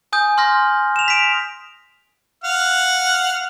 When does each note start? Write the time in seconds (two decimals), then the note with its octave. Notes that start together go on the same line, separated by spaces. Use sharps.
0.13 G#5 D#6 G6
0.38 C6 F6 G6 A#6
0.96 E7 F7
1.08 B6 D7 F7
2.44 F5 F#5 F6